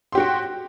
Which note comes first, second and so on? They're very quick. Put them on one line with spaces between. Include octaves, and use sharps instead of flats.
C6 G4 F#4 G5